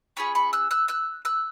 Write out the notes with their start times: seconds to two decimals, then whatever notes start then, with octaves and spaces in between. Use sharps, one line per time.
0.17 C#4 F4 G#4 B5 C#6
0.35 B5 C#6
0.53 E6 F#6
0.71 E6 F#6
0.88 E6 F#6
1.25 E6 F#6